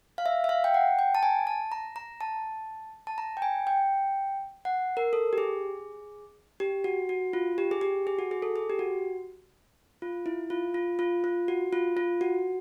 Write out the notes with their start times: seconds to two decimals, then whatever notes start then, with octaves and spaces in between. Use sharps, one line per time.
0.18 F5
0.26 E5
0.44 E5
0.49 F5
0.64 G5
0.74 F#5
0.99 G5
1.15 A5
1.23 G#5
1.47 A5
1.72 A#5
1.96 A#5
2.21 A5
3.07 A5
3.18 A#5
3.37 G5
3.42 G#5
3.67 G5
4.65 F#5
4.97 A#4
5.13 A4
5.33 G4
5.38 G#4
6.60 G4
6.84 F#4
7.09 F#4
7.33 F4
7.58 G4
7.71 G#4
7.81 G4
8.07 G#4
8.19 F#4
8.31 G#4
8.42 A4
8.56 G#4
8.70 G4
8.79 F#4
10.02 F4
10.26 E4
10.50 F4
10.74 F4
10.99 F4
11.24 F4
11.48 F#4
11.73 F4
11.97 F4
12.21 F#4